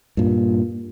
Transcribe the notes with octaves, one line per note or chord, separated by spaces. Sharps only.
G2 A#2